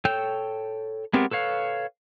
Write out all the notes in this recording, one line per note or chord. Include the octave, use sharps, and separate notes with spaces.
A4 C#5 G5 E6 G6
G#3 B3 C4 G4 A#4
A4 B4 C#5 F5